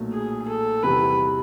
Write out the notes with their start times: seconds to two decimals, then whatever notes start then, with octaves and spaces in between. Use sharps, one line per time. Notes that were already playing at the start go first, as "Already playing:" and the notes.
Already playing: B1 A#2 F#3 A3
0.12 G#4
0.48 A4
0.83 E2 C3 E3 G3 B4